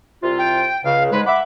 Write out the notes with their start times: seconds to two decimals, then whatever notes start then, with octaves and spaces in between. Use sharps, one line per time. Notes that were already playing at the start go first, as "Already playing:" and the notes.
0.23 C2 C3 F4
0.38 G5
0.84 C#2 C#3 F5
1.11 G#2 G#3 B4
1.26 E5 F#5 B5 D6